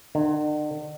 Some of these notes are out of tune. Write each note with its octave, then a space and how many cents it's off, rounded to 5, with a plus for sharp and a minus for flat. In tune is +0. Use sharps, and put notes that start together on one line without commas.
D3 +45